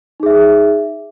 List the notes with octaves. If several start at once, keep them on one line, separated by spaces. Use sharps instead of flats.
D#4 G#4 E5